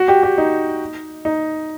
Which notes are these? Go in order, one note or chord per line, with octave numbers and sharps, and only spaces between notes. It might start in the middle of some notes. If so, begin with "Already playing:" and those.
Already playing: F#4
G4
G4
D#4
D#4